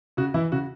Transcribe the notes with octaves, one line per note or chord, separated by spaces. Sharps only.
C#3 F#4
E3 E4
C#3 F#4